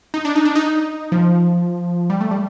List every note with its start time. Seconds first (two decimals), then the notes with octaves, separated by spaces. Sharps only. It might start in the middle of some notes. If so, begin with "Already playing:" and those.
0.14 D#4
0.25 D4
0.35 D#4
0.45 D4
0.55 D#4
1.12 F3
2.10 G3
2.21 A3
2.31 G3